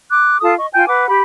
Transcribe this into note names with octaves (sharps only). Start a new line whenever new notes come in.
D6 F#6
F4 A4 A5 D#6
D#5 C#6
F4 G5 G#5 G6
B4 F#5 D6
G4 B5